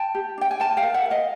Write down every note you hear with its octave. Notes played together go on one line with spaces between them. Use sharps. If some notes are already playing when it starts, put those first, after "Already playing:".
Already playing: G5 A5
G4
D4 G5
G#5
A#4 G5 A5
F5 G5
A#4
E5 F#5
A#4
D#5 F5